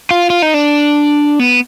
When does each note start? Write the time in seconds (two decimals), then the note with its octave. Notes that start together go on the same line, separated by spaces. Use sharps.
0.11 F4
0.30 F4
0.42 D#4
0.54 D4
1.39 B3